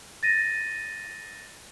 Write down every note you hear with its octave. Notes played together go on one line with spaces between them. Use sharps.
A6 A#6 D#7